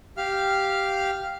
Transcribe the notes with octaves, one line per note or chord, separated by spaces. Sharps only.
G4 F5 F6